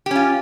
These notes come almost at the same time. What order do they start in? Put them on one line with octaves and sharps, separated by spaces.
G4 C#4 F4